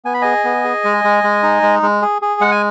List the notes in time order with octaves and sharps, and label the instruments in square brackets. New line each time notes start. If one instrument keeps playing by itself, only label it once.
[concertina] B3 G#5
B5
G#4 D#5 G#5
B3
G#4
G#3
G#3
G#3
D#4
G#3
G#3
G#4
G#4
G#3 F#5
G#5